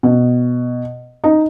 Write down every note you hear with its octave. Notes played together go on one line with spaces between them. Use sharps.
B2
D#4